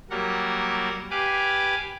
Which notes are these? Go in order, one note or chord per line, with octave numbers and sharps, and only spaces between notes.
F#3 G3 A#3 A#4 F#5
G4 B4 F5 G#5 D6